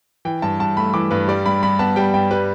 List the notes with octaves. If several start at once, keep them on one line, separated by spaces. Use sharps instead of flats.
E3 G5
G2 A5
G2 A5
A3 B5
E3 D6
G2 B4
G3 D5
G2 B5
G2 B5
B3 A5
G3 G5
G2 G5
G3 B4